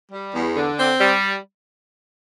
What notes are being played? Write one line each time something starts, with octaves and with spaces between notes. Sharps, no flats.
G3
E2
D3
C4
G3